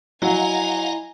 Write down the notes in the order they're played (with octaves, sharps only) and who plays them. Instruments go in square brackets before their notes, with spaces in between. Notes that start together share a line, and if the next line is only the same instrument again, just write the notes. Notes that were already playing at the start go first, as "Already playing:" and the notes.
[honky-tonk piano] F#3 [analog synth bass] E4 [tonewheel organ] D#5 F5 F#5 [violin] G#5 A#5